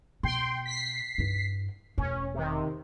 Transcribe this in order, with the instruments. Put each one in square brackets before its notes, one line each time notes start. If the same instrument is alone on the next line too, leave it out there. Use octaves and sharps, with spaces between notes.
[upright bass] B2 [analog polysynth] G5 C6
[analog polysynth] B6 C7
[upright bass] G2 E4
[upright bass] E1 A3 [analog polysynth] C#4
[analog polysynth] C3 D#3